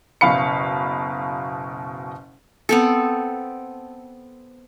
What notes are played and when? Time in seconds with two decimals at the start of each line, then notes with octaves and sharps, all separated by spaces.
0.21 F#1 B2 F5 B5 C#7
2.69 B3 C4 A4